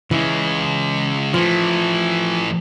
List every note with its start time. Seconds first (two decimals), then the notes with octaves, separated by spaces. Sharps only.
0.11 C#3 E3 G#3
1.34 E3 F3 A3